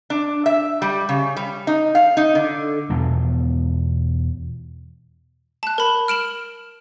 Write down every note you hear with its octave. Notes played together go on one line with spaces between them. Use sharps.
D4
E5
G3
C#3
G3
D#4
F5
D#4
D3
E2 B2 F3
A5 F#6
A#4 B5
F6 D7 E7 F#7